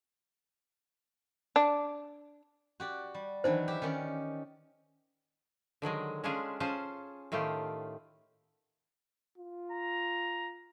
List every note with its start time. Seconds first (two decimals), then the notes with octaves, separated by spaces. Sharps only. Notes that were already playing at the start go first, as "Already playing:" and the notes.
1.56 D4
2.80 F#4 G4 D5
3.15 G3
3.44 D#3 E3 F#3 D4 D#4 C5
3.68 G4 E5
3.82 D#3 C#4 D5
5.82 D3 D#3 F#3 G#3
6.24 G#3 C#4 D4 F4 G#4
6.60 C#4 F4 G#4 C5 A5
7.32 A2 D#3 A3 F4 G4
9.38 F4
9.72 A#5